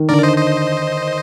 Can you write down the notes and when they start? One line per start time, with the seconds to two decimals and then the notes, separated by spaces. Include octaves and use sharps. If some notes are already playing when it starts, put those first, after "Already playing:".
Already playing: D#3
0.09 D3 A#4 D5
0.23 C5 D#5
0.37 C5 D#5